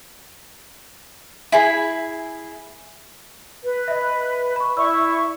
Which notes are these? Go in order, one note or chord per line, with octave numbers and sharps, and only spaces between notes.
E4 G#4 B5
B4
D#5 E5
B5 C#6
E4 D5 E5 B5 C#6 E6